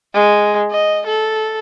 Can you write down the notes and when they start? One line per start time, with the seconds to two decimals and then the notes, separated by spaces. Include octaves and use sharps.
0.14 G#3
0.71 D#5
1.06 A4